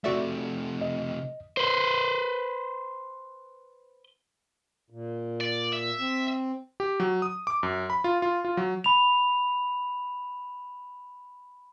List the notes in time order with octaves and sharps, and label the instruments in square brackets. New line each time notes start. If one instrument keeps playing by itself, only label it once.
[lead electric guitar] C3 A3 [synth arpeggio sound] F#4 D5 E5
[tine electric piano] D#5
[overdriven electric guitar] B4 C5
[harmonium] A#2
[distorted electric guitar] D5
E5
[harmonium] C4
[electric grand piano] G4
F#3
D#6
D6
F#2
B5
F4
F4
F4
F#3
[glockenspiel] B5 F7